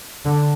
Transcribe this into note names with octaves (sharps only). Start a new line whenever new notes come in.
D3